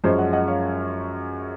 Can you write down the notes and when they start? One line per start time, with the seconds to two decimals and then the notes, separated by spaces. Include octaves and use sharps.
0.04 F#2 F3 G#3 C#4 C5 D#5
0.18 D#5 F#5
0.33 D#5 F#5
0.48 C#5 F5